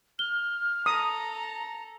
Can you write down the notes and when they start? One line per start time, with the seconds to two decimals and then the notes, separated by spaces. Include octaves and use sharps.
0.19 F6 G7
0.86 A4 A#5 D#6